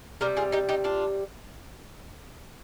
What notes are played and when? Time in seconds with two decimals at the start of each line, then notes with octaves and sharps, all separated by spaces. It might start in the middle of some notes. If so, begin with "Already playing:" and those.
0.21 C3 G3 G4 A#4
0.37 F4 G#4
0.52 D#4 G4
0.69 D#4 G4
0.84 D4 F4